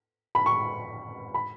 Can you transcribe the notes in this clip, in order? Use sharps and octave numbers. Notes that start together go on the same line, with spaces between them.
B5
C#6
B5